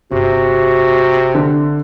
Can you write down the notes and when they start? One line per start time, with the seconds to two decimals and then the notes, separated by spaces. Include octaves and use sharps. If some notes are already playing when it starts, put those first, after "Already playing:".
0.12 G1 C3 F#4
1.35 D3